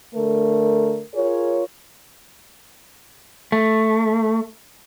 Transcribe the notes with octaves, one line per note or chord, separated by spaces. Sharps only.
D3 A3 A#4
F4 G#4 A#4 C#5
A3